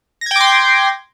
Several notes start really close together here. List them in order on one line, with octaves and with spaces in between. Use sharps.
A#6 G#6 G5 D6 C6